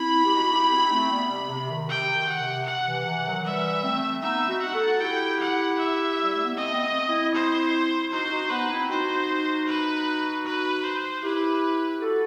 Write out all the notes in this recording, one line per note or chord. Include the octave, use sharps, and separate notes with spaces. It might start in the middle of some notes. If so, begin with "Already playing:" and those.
Already playing: C4 E4 B5
G4
D#4 F#4
E4 G4
C4 E4
D#4
A3 C4
G3 B3
C3
C3
D#3
C3 G5
D#3
F#5
C3
F#5
C3 E3
C3 E3
D#3 F#3
E3 G3 E5
A3 C4
B3 D#4 E5
D#4 F#4
F#5
F#4 A4
E4 G4 G5
F#5
E5
G3
A3
B3
A3 C4 D#5
A3
B3
A3 C4
C4 E4
C5
D#4 F#4 C5
D#4 F#4
B3 D#4 B4
C4 E4
D#4 F#4 C5
B4
B4
C5
E4 G4 B4
F#4 A4